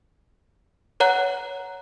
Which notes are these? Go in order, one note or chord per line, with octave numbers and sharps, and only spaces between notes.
B4 C#5 F#5 A#5 F#6